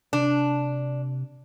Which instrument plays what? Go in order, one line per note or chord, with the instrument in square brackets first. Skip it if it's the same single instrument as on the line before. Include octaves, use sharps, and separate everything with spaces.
[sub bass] C3 [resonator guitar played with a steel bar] D4